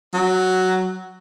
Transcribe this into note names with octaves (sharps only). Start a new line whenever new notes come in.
F#3